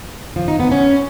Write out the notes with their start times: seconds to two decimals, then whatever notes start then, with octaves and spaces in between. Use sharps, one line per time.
0.36 F3
0.48 D#4
0.60 B3
0.72 C#4